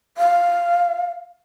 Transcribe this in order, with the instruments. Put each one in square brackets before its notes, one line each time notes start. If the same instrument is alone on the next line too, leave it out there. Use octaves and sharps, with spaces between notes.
[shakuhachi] F5